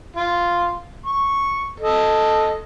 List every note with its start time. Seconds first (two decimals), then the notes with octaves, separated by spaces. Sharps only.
0.16 F4
1.06 C#6
1.80 A4 D#5